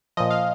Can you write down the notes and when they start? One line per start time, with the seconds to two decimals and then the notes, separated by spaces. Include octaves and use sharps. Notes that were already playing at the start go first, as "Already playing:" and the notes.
0.17 A#2 F3 D#5
0.31 F5